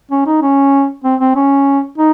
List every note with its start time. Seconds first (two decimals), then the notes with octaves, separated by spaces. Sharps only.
0.11 C#4
0.26 D#4
0.42 C#4
1.04 C4
1.20 C4
1.36 C#4
1.98 D#4